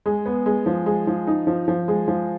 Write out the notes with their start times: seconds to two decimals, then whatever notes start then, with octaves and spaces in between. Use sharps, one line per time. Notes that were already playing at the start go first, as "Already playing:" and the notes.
0.06 G#3
0.26 B3
0.46 G#3
0.66 F3
0.86 G#3
1.07 F3
1.27 D#4
1.47 F3
1.68 F3
1.88 G#3
2.08 F3